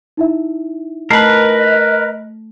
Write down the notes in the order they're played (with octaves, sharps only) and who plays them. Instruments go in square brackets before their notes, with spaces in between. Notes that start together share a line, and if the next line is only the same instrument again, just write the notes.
[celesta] D#4 E4 E5
[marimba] A3 [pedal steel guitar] A#4 B4 [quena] D#5